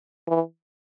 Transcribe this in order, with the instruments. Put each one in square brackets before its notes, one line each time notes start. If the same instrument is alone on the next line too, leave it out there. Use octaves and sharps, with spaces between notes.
[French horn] E3